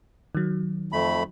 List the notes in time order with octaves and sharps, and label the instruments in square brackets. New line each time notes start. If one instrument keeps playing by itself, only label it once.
[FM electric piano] D#3 F#3
[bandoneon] F2 A3 B5